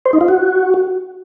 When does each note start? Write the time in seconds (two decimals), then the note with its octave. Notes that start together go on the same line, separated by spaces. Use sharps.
0.05 C5
0.13 D#4
0.21 F4
0.28 F#4